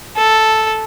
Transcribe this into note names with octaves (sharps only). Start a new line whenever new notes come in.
A4